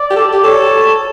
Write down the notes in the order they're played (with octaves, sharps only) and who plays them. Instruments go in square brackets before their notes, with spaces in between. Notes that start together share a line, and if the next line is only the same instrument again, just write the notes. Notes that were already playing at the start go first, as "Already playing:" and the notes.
Already playing: [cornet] D5
[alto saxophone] G4
A4
G4
[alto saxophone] A4 [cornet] C#5